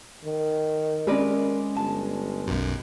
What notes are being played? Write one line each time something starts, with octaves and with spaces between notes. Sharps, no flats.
D#3
G#3 C#4 A#4 B4 D5
G1 A5
B1 F#2